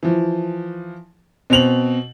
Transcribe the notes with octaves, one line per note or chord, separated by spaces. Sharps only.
E3 F3
B2 C4 F7 F#7